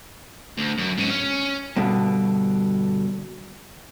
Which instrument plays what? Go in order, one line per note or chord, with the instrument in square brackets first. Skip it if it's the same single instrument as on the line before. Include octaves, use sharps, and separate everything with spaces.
[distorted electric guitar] D2
F#2
G#2 C#4
C#4
[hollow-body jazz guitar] G2 B2 D3